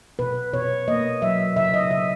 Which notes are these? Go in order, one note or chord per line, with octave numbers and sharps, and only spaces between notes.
B2 B4
B2 C#5
A#3 D#5
F#3 E5
C#3 E5
D#5
C#3 E5